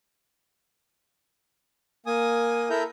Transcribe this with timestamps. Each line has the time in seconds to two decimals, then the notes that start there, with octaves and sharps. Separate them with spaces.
2.06 A#3 G#5 D#6
2.70 E4 A4 A#4 E5 A#5 G6